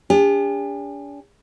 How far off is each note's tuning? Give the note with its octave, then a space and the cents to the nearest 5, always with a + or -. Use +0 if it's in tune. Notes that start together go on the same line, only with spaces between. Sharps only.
D4 -40 G4 +45